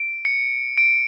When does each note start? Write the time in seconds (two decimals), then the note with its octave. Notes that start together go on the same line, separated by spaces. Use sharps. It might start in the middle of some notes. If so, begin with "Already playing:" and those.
Already playing: D7
0.25 C#7
0.78 D7